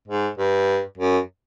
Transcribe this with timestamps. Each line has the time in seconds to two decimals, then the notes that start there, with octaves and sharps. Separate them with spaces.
0.08 G#2
0.38 G2
0.98 F#2